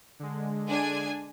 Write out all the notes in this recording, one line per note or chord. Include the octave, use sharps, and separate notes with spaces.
D3 G#3
D4 G#5